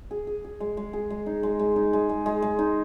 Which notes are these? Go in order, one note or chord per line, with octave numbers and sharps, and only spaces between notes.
G#4
G#4
G#4
G#3
G#3
G#4
G#3
D#4
G#3
G#3
D#4
G#3
G#3
G#3
G#3
D#4